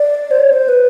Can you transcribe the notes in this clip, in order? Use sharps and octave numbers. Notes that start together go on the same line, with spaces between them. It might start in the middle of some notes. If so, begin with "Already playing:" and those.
Already playing: D5
C5
C#5
C5
B4